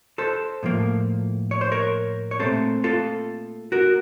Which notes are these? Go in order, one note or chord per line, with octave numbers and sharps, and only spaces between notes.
A4 C5
A2 F3 A#3
C#5
C5
A#4 C#5
C#5
A#2 A3 C4 A4 C5
F4 A4
F#4 A#4